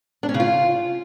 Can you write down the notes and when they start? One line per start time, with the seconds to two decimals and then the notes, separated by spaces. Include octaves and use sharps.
0.23 D4
0.29 C#4
0.34 C#3
0.40 F4